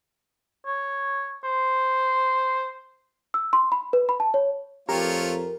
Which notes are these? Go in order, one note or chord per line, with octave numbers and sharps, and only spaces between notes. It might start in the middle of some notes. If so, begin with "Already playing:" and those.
C#5
C5
E6
C6
B5
B4
B5
A5
C#5
F2 A3 F4 G4 A#4 C#5